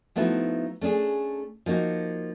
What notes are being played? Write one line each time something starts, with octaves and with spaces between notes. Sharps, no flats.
F3 A3 B3 D#4 E4 F#4
A3 C#4 D4 G#4
F3 A#3 D#4 F#4